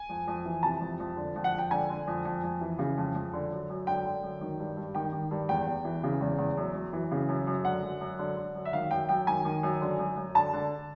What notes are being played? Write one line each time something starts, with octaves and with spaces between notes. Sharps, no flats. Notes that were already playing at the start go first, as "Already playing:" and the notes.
Already playing: G#5
F2
F2
E3
C3 A5
F2
F2
D3
F2
F#5
F2
G5
D3 G#5
D3
F2
F2
F2
E3
C#3
F2
F2
D3
F#2
F#2
D3 G5
D3
F#2
D#3
G2
G2
D#3 G5
D#3
G2
E2 G5
E2
E3
C#3
E2
E2
F#2
F#2
E3
C#3
F#2
F#2
D3 F#5
F#2
F#2
D3
D3
F#2
E5
D#3 F5
F#2 G5
F#2 G5
D#3 G#5
D#3
F#2
D3
F#2
F#2
D3 A5
D3